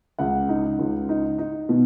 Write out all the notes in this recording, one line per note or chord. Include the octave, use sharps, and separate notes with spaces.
C#2 F#5
D#4
C#2
D#4
D#4
B2